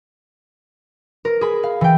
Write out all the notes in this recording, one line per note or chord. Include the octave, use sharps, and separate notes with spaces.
A#4
G#4 B5
F5
E3 G5